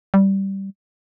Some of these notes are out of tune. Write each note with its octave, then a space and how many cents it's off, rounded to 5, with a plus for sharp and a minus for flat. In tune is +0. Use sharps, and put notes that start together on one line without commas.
G3 -10